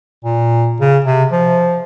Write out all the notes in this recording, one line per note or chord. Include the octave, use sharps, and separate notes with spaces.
A#2
C#3
C3
F3